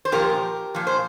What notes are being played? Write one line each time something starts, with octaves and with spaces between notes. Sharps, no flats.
C5
A#2 F3 G4 A#4
A#2 F3
C5